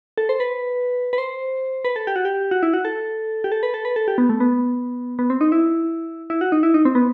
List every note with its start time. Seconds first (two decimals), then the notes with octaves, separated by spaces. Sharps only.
0.18 A4
0.29 C5
0.40 B4
1.13 B4
1.18 C5
1.85 B4
1.96 A4
2.07 G4
2.16 F#4
2.25 G4
2.51 F#4
2.63 E4
2.73 F#4
2.85 A4
3.44 G4
3.52 A4
3.63 B4
3.74 A4
3.85 B4
3.96 A4
4.08 G4
4.18 B3
4.29 A3
4.40 B3
5.19 B3
5.30 C4
5.41 D#4
5.52 E4
6.30 E4
6.41 F#4
6.52 D#4
6.63 E4
6.74 D#4
6.85 C4
6.95 B3